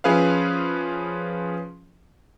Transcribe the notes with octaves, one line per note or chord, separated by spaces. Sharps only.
F3 C#4 G#4 B4 E5 F5